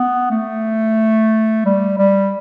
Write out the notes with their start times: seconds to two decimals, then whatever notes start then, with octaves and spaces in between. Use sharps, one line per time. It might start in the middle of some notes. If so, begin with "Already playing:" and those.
Already playing: B3
0.31 A3
1.65 G3
1.98 G3